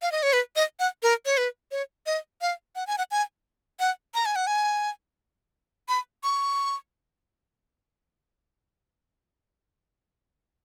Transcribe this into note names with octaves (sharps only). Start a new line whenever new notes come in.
F5
D#5
C#5
B4
D#5
F#5
A#4
C#5
B4
C#5
D#5
F5
F#5
G#5
F#5
G#5
F#5
A#5
G#5
F#5
G#5
B5
C#6